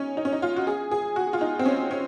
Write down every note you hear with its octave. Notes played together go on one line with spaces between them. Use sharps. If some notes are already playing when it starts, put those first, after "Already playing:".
Already playing: C#4 D#4
D#4
C#4
D#4
F4
F#4
G#4
G#4
F#4
F4
D#4
C4
C#4
C#4